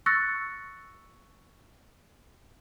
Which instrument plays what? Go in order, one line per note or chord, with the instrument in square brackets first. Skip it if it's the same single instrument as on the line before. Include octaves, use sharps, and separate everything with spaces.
[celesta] C#6 E6 F#6 A6 A#6 C#7